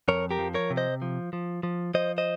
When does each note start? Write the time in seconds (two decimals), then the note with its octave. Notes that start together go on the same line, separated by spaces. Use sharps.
0.08 F2 A#4 C#5
0.31 G4 A#4
0.39 F3
0.54 A#4 C#5
0.70 C3
0.77 C5 D#5
1.02 F3
1.33 F3
1.63 F3
1.94 F3 C5 D#5
2.18 C5 D#5